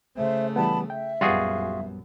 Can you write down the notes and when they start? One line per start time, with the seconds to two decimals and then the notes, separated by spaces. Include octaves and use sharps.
0.15 C#3 A3 C5 E5
0.56 E3 G3 B3 A5 B5
0.90 E5 G5
1.21 A#1 F#2 G3 B3 F4 F#4 G#4